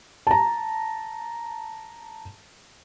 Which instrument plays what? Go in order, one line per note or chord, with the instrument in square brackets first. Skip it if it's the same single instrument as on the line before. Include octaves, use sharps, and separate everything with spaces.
[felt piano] A5 A#5